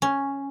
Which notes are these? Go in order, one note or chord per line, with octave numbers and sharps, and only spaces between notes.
C#4